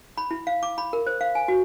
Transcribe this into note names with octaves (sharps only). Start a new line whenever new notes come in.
B5
E4
F5
D6
B5
A#4
C5
F5
G#5
F#4